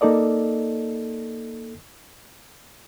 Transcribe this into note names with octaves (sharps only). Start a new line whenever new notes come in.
A#3 D#4 A4 D5 D#5